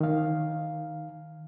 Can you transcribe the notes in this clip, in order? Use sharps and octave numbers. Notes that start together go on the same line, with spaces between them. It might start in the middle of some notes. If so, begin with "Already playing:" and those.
D#3 F5